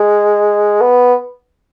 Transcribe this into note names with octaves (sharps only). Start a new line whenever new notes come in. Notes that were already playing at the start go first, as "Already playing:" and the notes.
Already playing: G#3
B3